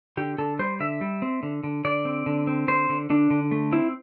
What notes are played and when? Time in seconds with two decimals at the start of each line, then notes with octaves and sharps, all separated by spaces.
0.17 D3 G4
0.38 D3 A4
0.59 G3 C5
0.80 D3 E5
1.01 G3
1.22 C4
1.43 D3
1.63 D3
1.85 D3 D5
2.05 C4
2.26 D3
2.47 C4
2.68 D3 C5
2.89 D3
3.10 D3 D4
3.30 D3
3.51 A3
3.72 C4 E4